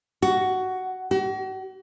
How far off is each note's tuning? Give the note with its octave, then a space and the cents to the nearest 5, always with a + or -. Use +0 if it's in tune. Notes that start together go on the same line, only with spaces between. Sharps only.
F#4 +10
F#4 +40